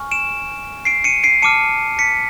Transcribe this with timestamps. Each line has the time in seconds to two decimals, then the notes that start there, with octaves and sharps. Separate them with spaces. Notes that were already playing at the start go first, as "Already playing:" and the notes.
Already playing: G#5 C#6 F6
0.11 D7 E7
0.85 C7 D7
1.04 C#7 D#7
1.23 C7 D7
1.42 A5 D6 F6 C#7 D#7
1.99 B6 C#7